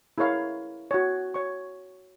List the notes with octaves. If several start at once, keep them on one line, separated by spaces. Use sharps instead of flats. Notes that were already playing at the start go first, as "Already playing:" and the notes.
E4 G#4 A#4 C#5 F5
F#4 C#5
C#5 C#6